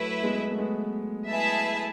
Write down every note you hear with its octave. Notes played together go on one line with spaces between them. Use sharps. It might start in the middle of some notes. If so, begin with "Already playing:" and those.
Already playing: F#3 A3 E4 B4 E5
G#3 B3
A3
G#3 B3
E4 G#4 B4 E5 A5